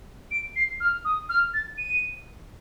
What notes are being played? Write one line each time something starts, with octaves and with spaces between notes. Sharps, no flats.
D7
C7
F6
D#6
F6
A6
D#7